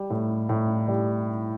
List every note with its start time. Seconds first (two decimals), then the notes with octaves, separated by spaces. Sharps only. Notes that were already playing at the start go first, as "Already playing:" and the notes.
Already playing: G3
0.10 A2
0.49 A2
0.88 G3